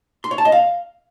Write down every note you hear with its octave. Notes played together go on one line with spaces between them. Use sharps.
C6
C#5
A5
D#5
F5